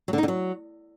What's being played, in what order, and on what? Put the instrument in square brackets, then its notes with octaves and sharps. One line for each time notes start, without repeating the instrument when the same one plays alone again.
[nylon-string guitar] F#3
D3
D#4
D3
F#3